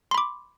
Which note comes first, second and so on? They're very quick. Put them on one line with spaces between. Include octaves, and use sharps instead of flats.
C6 B5 D6